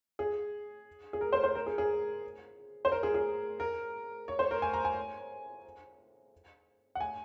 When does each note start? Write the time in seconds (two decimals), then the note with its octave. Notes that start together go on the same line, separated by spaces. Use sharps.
0.19 G#4
1.13 G#4
1.21 A#4
1.33 C5
1.44 C5
1.55 A#4
1.67 G#4
1.78 G#4
2.85 C5
2.92 A#4
3.03 G#4
3.14 G#4
3.60 A#4
4.28 C#5
4.39 C5
4.51 A#4
4.62 G#5
4.74 A#5
4.85 G#5
6.95 F#5
7.00 G#5